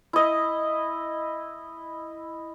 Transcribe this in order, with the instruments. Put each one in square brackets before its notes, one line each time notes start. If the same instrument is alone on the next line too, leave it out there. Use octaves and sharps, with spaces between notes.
[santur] E4 D#5